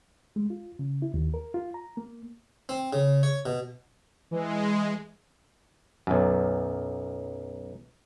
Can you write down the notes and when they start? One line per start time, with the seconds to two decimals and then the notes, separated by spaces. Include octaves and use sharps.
0.36 G#3
0.50 F4
0.79 C#3
1.02 E4
1.14 D#2
1.34 A#4
1.54 F4
1.74 A#5
1.97 A#3
2.69 C4
2.93 C#3
3.23 C#5
3.46 B2
4.31 E3 G#3
6.07 B1 F#2